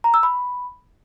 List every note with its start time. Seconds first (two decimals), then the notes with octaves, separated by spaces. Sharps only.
0.04 A#5
0.14 E6
0.23 B5